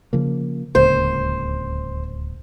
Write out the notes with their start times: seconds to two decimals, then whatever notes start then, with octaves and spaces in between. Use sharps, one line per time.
0.13 C#3 F3 A#3
0.75 D1 C#2 A#3 C5